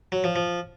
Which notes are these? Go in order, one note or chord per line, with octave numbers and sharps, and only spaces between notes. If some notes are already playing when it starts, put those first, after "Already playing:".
F#3
F3
F3